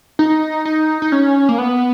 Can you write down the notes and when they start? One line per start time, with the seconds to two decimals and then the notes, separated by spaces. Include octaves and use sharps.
0.19 D#4
0.65 D#4
1.02 D#4
1.12 C#4
1.49 A#3
1.58 B3